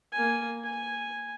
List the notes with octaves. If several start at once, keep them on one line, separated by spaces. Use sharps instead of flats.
A#3 G#5
G#5